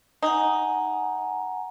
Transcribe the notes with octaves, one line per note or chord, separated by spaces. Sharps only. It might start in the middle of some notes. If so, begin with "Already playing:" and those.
D#4 F#5 G#5 A#5